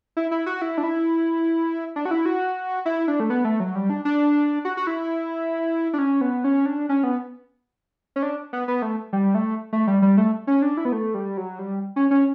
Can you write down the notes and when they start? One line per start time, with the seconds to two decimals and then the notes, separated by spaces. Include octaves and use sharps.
0.17 E4
0.31 E4
0.46 F#4
0.62 E4
0.78 D4
0.83 E4
1.96 D4
2.05 F#4
2.11 E4
2.26 F#4
2.86 E4
3.08 D4
3.20 A3
3.30 B3
3.45 A3
3.60 F#3
3.75 G3
3.90 D4
4.05 D4
4.65 F#4
4.77 F#4
4.87 E4
5.93 D4
5.98 C#4
6.21 B3
6.44 C#4
6.66 D4
6.89 C#4
7.04 B3
8.16 C#4
8.23 D4
8.53 B3
8.68 B3
8.82 A3
9.13 G3
9.35 A3
9.73 A3
9.87 G3
10.02 G3
10.17 A3
10.47 C#4
10.62 D4
10.77 E4
10.85 B3
10.92 A3
11.14 G3
11.37 F#3
11.59 G3
11.96 C#4
12.11 C#4